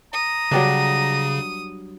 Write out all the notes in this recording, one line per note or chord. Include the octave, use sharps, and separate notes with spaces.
A#5 D#6
C#3 F#3 G3 D4